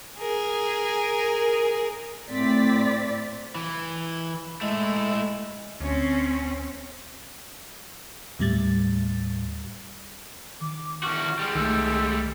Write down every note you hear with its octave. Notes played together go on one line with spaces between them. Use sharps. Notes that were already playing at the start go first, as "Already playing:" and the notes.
G#4 A#4
A2 C4 D5 A6 B6
E3
G#3 A3 E4
D2 C4 C#4
D#2 A2 G3 A6
D#3 D6
E2 F#4 F6
G3 G#3
C2 D#3 A3 E6